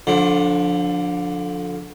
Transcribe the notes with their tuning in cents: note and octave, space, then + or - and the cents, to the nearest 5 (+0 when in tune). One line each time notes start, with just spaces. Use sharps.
D3 -5 F3 +30